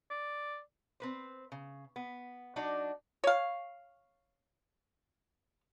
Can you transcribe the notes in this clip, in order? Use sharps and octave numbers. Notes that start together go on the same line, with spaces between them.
D5
C4 B4 C5
C#3
B3
F#3 D4 D#4 F#4
C#5 F5